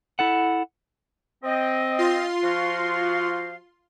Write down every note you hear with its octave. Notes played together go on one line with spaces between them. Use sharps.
E4 A4 F#5
C4 D#5
F4 C6
F3 F#4 F5